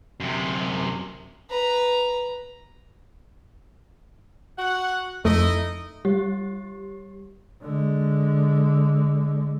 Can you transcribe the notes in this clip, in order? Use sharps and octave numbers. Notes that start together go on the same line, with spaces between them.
F#2 C3
B4 A#5
F#4 F#5
F2 A3 D#4 E4 D#5
G3 G4
D3 G#3